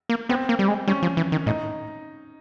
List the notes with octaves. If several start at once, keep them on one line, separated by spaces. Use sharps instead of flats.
A#3
B3 C4
A#3
G3
G#3
G3 C#4
F3
E3
D#3
A2 D#4